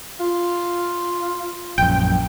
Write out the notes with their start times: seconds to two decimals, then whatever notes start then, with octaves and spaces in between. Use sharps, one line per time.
0.20 F4
1.78 A#1 F#2 G5